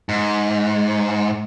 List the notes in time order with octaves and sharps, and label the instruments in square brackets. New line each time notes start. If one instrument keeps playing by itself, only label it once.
[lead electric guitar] G#2